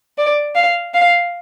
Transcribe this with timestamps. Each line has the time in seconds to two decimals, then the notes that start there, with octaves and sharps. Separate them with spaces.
0.17 D5
0.55 F5
0.93 F5